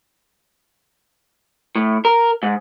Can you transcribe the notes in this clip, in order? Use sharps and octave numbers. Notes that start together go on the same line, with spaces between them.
A2
A#4
G#2